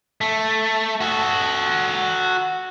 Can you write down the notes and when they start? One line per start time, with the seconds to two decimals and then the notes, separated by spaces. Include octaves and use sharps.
0.21 A3
1.01 F#4 A4